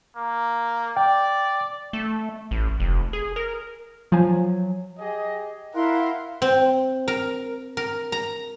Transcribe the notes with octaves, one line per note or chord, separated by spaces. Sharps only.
A#3
D5 G5
A3
A1
F1
G#4
A#4
F3 F#3 G#5
G4 G#4 D#5
E4 A#4 F5 F#5 C6
C4
A#4
A#4
A#5